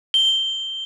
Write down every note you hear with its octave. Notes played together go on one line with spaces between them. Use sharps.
G7